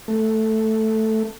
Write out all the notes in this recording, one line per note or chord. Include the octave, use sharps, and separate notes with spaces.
A3